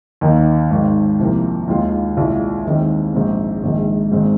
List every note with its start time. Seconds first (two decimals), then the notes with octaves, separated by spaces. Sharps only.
0.21 D#2 D#3 A#3 D#4
0.70 G#1 G#2 D#3
1.19 C2 C3 F3 A#3
1.68 D#2 D#3 G#3 F4
2.17 C2 A#2 G#3 F4
2.65 D#2 D#3 G#3 C4
3.14 A#1 G#2 G#3 C4
3.63 A#1 G#2 D#3 G#3
4.12 G#1 G#2 G#3 C4 D#4